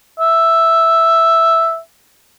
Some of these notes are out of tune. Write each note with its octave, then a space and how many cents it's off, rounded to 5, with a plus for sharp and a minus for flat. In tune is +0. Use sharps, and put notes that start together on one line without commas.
E5 +0